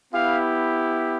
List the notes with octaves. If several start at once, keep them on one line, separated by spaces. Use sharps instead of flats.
B3 E4 G4 F5